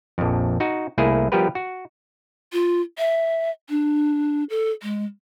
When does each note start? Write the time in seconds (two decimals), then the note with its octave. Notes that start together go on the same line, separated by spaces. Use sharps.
0.18 A#1 F2
0.60 D#4 F#4
0.98 C2 A3 A#3 E4 G#4
1.32 F3 G3 B3 G4 A#4 B4
1.55 F#4
2.53 F4
2.99 E5
3.69 D4
4.50 A4
4.83 G#3